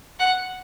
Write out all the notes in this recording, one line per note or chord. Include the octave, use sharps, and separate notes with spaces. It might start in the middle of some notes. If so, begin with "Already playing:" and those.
F#5